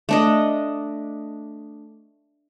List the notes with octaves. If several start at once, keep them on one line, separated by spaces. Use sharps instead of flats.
A3 D4 D#5